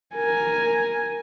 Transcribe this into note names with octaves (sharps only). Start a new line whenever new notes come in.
A#4 G#5